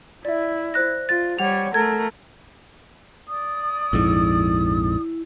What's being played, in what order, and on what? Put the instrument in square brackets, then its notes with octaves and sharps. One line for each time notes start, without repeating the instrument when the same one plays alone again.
[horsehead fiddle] E4 [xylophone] D5 E5
[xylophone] C5 F#6 A#6
[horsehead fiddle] F4 [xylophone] A6
[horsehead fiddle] G3 C#5 [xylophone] F#5 F7
[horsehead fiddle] A3 A#4 [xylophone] G#6
[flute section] D5 D#6
[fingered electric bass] A#1 F2 G#2 [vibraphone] E4